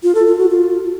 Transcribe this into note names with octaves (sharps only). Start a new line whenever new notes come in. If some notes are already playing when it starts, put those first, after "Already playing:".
F4
A4
F4
F#4
F4